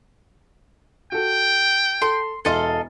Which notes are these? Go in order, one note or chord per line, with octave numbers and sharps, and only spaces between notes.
F#4 A4 G5
A4 C6
E1 E4 A4 D#5 F5 C6